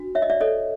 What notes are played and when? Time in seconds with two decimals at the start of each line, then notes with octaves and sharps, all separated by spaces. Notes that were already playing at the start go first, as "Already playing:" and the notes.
Already playing: D4 F#4
0.15 C#5 E5
0.22 D#5
0.30 D5 E5
0.41 A4 C#5 D#5